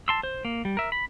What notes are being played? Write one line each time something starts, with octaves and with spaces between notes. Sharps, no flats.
A5 C6 E6
C5
A#3
G3
A#4 E5
B5